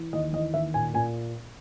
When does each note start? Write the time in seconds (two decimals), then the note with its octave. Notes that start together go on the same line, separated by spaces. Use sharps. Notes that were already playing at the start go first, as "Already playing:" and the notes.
Already playing: E3
0.13 D#2 D#5
0.33 E3 D#5
0.54 D#2 E5
0.74 A#2 G#5
0.94 A#2 G#5